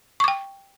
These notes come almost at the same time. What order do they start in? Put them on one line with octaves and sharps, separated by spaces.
C#6 D6 G5